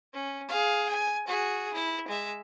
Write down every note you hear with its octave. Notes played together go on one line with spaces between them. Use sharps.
C#4
G#4 F5
G#5
F#4 G#4
E4
G#3 E5